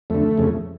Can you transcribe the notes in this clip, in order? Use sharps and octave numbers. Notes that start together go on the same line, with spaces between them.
F2 D3 A3
F2 C#3